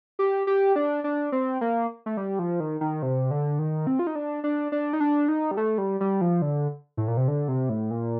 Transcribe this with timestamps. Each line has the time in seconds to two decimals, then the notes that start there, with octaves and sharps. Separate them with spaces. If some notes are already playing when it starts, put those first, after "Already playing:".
0.19 G4
0.47 G4
0.76 D4
1.04 D4
1.32 C4
1.61 A#3
2.06 A3
2.17 G3
2.39 F3
2.60 D#3
2.81 D#3
3.03 C3
3.31 D3
3.59 D#3
3.87 C4
3.99 F4
4.07 D#4
4.15 D4
4.44 D4
4.72 D4
4.93 D#4
5.00 D4
5.28 D#4
5.51 G3
5.57 A3
5.78 G3
6.00 G3
6.21 F3
6.42 D3
6.97 A2
7.08 A#2
7.17 C3
7.28 D3
7.48 C3
7.69 A2
7.91 A#2